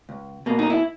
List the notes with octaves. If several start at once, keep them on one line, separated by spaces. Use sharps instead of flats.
C#2
B2 A#3
D#4
E4